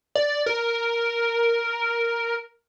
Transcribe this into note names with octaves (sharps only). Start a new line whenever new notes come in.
D5
A#4